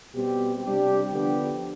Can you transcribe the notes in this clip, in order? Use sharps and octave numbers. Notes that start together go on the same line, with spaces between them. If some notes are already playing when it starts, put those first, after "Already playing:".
B2 G3 C4 G4
C3 G3 D4 G4
D3 F3 B3 D4 G4